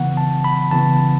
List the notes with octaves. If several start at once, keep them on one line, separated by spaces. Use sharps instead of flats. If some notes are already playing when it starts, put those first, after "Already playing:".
Already playing: C#3 E3 B3 F#5
A5
B5
C#3 E3 B3 A5